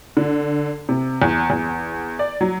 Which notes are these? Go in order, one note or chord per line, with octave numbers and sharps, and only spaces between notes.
D3
C3
E2
E2
D5
F#3